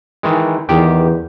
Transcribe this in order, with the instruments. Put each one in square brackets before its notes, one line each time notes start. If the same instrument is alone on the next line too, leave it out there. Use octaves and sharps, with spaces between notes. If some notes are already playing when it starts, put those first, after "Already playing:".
[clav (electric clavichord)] D#3 E3 G#3
[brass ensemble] E2 [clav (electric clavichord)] D#3 G4 G5